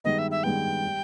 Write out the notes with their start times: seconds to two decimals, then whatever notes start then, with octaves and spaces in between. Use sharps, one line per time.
0.04 G2 D#3 G#3 B3 D#5
0.19 E5
0.31 E5
0.44 G2 D#3 G#3 B3 G5
0.84 G3